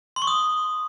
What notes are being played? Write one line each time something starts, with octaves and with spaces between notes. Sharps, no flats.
C6
C#6
D#6